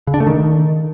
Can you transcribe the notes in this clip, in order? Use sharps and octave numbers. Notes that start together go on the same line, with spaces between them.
C#3
D4
A3
D#3